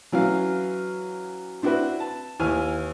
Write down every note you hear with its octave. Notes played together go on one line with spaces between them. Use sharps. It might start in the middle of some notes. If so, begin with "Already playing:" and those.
E3 F#3 C#4 F5
C4 D4 E4 F#4 B4
A5
D#2 E3 G#5 F6